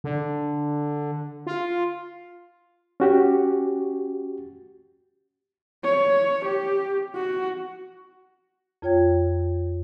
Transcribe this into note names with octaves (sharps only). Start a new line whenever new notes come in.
D3
F4
C#4 F#4 G4
C#5
G4
F#4
F2 F4 C#5 G5 G#6